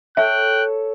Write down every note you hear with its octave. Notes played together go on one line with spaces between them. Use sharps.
A4 C#5 E5 G5 F#6